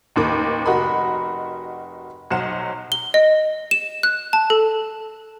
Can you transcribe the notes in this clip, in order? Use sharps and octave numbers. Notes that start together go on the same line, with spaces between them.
A1 D#2 D#3 D6
F1 F#4 A#4 D#5 B5
B1 F#3 C5 F#5 E7
G7
D#5
E7
F#6
A5
A4